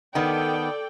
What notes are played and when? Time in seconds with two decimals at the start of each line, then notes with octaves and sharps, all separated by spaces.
0.15 D#3 B3 A4 D5 G5